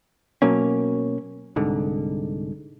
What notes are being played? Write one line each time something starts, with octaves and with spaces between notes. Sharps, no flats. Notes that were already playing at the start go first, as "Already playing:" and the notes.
B2 F#3 A#3 C#4
C2 G#2 D3